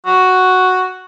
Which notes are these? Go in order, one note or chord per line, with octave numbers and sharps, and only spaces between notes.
F#4